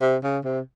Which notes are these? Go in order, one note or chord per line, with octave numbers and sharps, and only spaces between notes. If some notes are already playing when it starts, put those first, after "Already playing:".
C3
C#3
C3